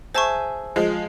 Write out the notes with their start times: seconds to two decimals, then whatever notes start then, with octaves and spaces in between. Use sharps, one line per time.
0.15 G#4 C5 E5 G#5 A5 C#6
0.76 F3 G#3